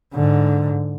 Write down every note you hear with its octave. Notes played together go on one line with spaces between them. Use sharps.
G#2 D3